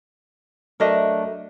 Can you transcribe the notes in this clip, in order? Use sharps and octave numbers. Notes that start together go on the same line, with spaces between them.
F#3 A3 D4 A#4 D#5 E5